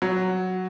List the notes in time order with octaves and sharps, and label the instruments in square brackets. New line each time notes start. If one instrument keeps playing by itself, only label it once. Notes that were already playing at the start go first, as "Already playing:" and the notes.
[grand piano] F#3